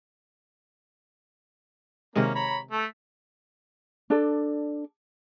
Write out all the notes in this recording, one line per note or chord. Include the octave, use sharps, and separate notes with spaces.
C3 D#3 G#3 A#3 C#4
C#5 A#5 B5
A3 A4
D4 A4 D5